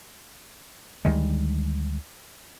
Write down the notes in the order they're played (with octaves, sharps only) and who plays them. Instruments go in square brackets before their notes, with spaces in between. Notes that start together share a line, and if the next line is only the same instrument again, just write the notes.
[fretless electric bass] D2 D#3 G3 G#3